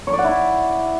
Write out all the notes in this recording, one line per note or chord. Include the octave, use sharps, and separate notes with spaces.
C#5
D5
F#5
E4